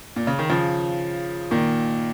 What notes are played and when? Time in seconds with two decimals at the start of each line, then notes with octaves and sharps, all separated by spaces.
0.16 A#2
0.27 C#3
0.39 D#3
0.50 C#3 F3
1.51 A#2 D#3